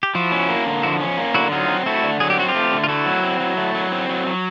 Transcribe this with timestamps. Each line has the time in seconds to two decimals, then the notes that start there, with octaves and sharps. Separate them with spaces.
0.03 G4
0.15 F3 E4 F#4
0.32 C#4
0.49 A#3
0.66 D3
0.83 F3 E4 F#4
1.00 C#4
1.18 A#3
1.34 D3 E4 F#4
1.52 F#3 D#4 F4
1.68 C4
1.86 A3 E4 F#4
2.03 D3
2.20 F#3 G#4
2.30 G4
2.38 C4 F#4
2.49 F4 G4
2.55 A3
2.72 D3
2.84 F4
2.89 A3 E4 F#4
3.06 F#3
3.23 C4
3.40 F#3
3.57 A3
3.74 F#3
3.92 C4
4.09 F#3
4.26 F#3